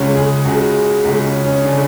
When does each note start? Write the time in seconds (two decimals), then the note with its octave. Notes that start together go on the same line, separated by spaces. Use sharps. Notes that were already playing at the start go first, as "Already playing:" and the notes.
Already playing: C#2 C#3 G#3 C#4
0.15 G#4
0.44 C#2 C#3 G#3 F#4
1.04 C#2 C#3 G#3
1.24 C#4
1.45 C#4
1.64 C#3 G#3 D4